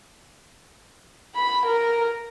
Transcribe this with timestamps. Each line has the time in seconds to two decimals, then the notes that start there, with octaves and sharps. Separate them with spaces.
1.36 B5
1.66 A#4